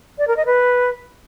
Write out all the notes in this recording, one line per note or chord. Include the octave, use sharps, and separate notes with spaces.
D5
A#4
D#5
B4